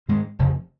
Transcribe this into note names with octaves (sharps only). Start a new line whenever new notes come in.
G#2 D#3 G#3
F1 F2 C#3